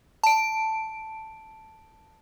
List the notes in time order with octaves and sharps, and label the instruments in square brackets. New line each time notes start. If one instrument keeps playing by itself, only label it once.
[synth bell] A5 D7